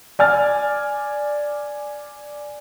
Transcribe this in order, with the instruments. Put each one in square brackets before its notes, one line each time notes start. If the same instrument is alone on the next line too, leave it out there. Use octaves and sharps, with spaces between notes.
[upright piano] D5 G#5 F6 A6